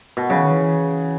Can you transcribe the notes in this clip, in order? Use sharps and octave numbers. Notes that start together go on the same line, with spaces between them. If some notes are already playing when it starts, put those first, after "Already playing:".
B2
C#3 F#3
E3
D#3
E3